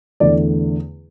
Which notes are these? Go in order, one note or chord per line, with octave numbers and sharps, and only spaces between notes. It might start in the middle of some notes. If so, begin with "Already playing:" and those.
E2 D3 A3 D5